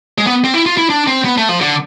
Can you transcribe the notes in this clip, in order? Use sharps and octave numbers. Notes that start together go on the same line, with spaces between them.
G#3
B3
C4
E4
F4
E4
D4
C4
B3
A3
F3
D3